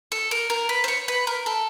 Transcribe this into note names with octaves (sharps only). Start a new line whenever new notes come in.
A4
A#4
A#4
B4
C5
C#5
B4
A#4
A4